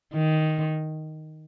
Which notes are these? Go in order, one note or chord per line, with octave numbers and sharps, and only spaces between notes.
D#3